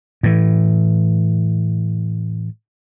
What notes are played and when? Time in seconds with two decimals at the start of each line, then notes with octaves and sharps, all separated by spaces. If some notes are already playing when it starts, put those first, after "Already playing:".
0.23 A2 E3